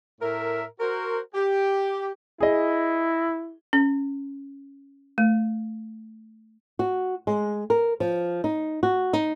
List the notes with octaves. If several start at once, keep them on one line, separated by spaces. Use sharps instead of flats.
A2 A#4 E5
F#4 A#4 C5
G4
E4 G#4 D#5
C#4
A3
F#4
G#3
A#4
F3
D#4
F#4
D#4